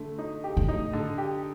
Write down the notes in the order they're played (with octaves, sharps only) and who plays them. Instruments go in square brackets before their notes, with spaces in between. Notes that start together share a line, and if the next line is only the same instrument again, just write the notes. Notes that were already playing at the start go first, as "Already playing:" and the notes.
Already playing: [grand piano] D3 A3
D#4
G4
[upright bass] A2
[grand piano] D#4
D3
G4